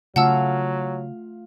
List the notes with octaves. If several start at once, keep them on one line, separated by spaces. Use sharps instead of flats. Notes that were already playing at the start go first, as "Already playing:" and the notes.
C#3 F#3 A3 F4 F5 F#5 A5 E6